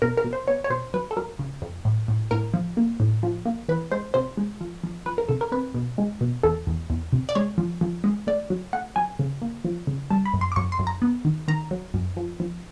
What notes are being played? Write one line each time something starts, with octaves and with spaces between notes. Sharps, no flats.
B2 A#4
A#4
B2
C5
B3 C#5
C#5
B2 C5
F#3 B4
A4
F#3 A#4
C#3
F2
A2
A2
A2 A#4
F3
A#3
A2
F3
A#3
E3 B4
G#3 C5
C3 C5
G#3
F3
F3
F3 B4
A#4
C3 A4
A#4
C4 B4
B2
G#3
B2
E2 A4
E2
E2
C3
D5
G#3 C#5
F3
F3
G#3
A3 D5
F#3
A3 F#5
F#3 G#5
C#3
A#3
F3
C#3
G3 A5
B5
F#2
C6
D6
F#2 C#6
C6
F#2
A#5
B3
D#3
D#3 A#5
F#3
F#2
F3
F3